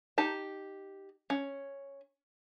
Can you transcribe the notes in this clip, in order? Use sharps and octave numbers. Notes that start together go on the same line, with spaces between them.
D#4 G4 A5
C#4